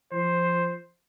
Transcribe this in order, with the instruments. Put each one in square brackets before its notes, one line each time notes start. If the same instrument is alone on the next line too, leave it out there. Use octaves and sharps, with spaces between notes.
[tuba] F3 [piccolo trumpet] C5